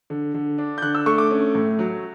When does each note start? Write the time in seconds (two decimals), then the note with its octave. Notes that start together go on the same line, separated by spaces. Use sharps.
0.10 D3
0.34 D3
0.58 D4
0.78 G6
0.82 D3 F#6
0.95 E6
1.06 A3 C#6
1.18 D6
1.31 C#4
1.55 A2
1.79 F#3